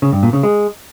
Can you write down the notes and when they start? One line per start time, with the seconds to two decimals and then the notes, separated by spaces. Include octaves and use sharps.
0.02 C#3
0.13 G2
0.23 A#2
0.33 C#3
0.43 G#3